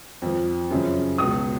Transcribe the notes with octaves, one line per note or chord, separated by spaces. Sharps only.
F2 F3
F#2 C#3 F3
C#2 B2 D#6